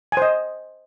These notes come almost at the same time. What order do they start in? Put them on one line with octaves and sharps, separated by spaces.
G#5 C5 D#5